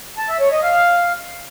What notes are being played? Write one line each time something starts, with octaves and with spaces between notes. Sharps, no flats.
A5
E5
C#5
D#5
F5